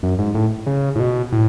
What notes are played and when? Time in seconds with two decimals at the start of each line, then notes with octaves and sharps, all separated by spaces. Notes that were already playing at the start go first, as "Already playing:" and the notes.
0.03 F#2
0.19 G#2
0.34 A2
0.67 C#3
0.96 A2
1.00 B2
1.32 A2